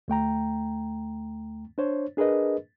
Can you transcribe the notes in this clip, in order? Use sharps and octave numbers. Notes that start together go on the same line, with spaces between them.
D2 A3 G5 A#5
D4 C5 C#5
D4 G#4 A#4 B4 D#5